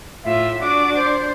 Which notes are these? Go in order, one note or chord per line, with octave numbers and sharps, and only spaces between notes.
A2 F4 E5
D4 F#4 D6
C5